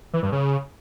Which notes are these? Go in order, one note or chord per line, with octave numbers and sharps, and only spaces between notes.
E3
G2
C#3